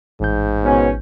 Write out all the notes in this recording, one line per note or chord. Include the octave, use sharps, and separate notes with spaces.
A1 G#2 G6
B2 B3 C#4